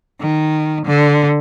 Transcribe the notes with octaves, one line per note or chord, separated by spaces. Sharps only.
D#3
D3